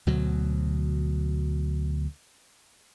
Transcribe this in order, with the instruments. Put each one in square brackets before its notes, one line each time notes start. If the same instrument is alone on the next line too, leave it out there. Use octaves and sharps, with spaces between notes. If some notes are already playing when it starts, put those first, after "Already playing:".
[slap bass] D2 B2 F#3